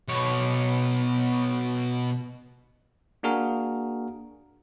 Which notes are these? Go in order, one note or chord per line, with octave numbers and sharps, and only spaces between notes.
B2 C#5
A#3 D4 F#4 G#4 A#4 F5